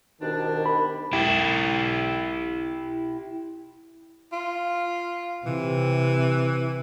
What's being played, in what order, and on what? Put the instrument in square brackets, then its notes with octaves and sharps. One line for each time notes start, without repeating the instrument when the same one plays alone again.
[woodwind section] C2 B2 D4 [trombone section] D#3
[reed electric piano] B5
[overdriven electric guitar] E4 G4
[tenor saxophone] F4
[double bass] C3 [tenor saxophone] E3